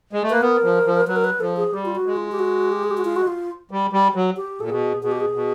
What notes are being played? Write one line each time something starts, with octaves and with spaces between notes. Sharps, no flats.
G#3
A3
A#3 B4
B3 A#4
F3
F3
F#3 B4
A#4
B4
F3 A4
G#4
G3 G4
F4
F#4
G#3
F4
G4
F#4
G4
G#4
G4
F#4
F4
F#4
F4
G3
G3
F#3
G4
A#2 A4
B2 G#4
B2 G#4
G4
G#4
B2